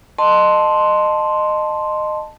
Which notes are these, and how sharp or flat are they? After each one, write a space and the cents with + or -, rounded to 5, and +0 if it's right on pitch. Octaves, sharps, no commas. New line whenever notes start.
D#5 -20 A5 +0 C6 +0